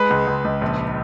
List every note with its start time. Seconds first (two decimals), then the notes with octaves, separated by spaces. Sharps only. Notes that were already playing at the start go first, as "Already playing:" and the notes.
Already playing: G#3 B4
0.10 C#2
0.27 C#2
0.45 C#2
0.61 A#1